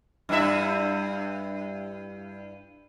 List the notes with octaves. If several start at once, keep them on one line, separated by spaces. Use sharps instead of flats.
G2 E4 E5